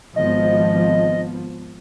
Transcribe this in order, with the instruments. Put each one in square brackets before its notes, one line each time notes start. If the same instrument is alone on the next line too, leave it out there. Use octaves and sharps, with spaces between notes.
[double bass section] G#1 F3 B3 [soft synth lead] D#5